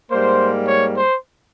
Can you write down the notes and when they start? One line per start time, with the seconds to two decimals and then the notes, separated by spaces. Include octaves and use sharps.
0.11 G#2 G3 A#3 C5
0.68 C#5
0.96 C5